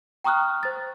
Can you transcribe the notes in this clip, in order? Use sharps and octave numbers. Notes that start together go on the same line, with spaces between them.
G5 A#5 C#6 D#6 F6 F#6
C5 A6